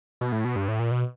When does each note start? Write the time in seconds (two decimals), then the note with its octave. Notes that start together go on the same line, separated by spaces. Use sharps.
0.21 B2
0.32 A2
0.45 B2
0.56 G2
0.68 A2
0.80 A#2
0.91 B2